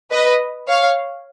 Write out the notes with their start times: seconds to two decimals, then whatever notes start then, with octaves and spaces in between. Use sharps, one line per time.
0.11 B4 D#5
0.68 C#5 F5